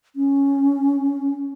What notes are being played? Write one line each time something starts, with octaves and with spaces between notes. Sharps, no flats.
C#4